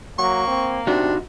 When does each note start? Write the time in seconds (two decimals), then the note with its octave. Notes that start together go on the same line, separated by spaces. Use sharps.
0.18 F#3 A#3 C#6
0.48 C4
0.87 C3 D4 D#4 F#4